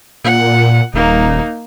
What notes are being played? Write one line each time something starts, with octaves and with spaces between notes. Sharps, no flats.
A#2 F#5
D#1 A#3 D#4